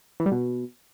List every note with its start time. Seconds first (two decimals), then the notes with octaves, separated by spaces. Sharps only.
0.20 E3
0.26 G3
0.32 B2